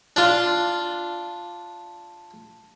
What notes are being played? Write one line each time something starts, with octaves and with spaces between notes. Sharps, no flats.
D4 F4